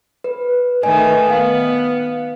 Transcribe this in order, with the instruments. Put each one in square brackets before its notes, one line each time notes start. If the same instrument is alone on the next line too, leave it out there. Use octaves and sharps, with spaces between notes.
[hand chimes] B4
[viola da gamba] D#3 A3 [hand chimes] B4 D#5 G#5
[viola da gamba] B3 [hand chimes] F5